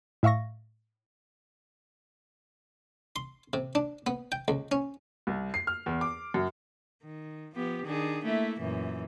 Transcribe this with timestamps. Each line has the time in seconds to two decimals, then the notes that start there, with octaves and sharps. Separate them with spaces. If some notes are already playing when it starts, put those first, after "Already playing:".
0.23 A2 E5 F5 C#6 A#6
3.16 C6
3.53 C3
3.75 D4
4.07 B3
4.32 G5
4.48 C#2
4.72 C#4
5.27 C2
5.54 C7
5.67 F6
5.86 E2
6.01 D6
6.34 F#2
7.03 D#3
7.55 F3 B3 G4
7.85 D#3 D4 G#4
8.25 A3 A#3 E4
8.59 F#2 A#2 E3